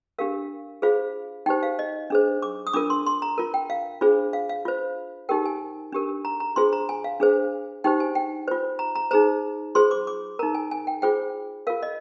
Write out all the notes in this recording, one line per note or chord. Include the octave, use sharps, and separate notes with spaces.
D4 G4 A#4 F5
F4 G#4 C5 F5
D#4 G4 C5 G5
F5
D#5
D4 G#4 C5
D6
D#6
D4 F4 A#4 D6
C6
C6
A#5
F4 A#4
G5
F5
D4 F4 G#4 C5
F5
F5
F4 C5
D#4 G4 A#4 G5
G#5
D4 G4 A#4
A#5
A#5
D4 F4 G#4 C5 C6
A#5
G#5
F5
D4 G#4 C5
D#4 G4 C5 G5
G#5
G5
F4 C5
A#5
A#5
D#4 G#4 C5 A#5
F4 G#4 C5 C6
D6
D6
D#4 A#4 A#5
G#5
G#5
G5
F4 G#4 C5 G5
F4 A#4 F5
D#5